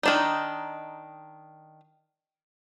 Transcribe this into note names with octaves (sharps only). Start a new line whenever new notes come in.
D#3 D4 D#4